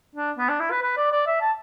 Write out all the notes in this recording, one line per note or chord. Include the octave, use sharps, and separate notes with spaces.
D4
B3
D4
E4
B4
B4
D5
D5
E5
A5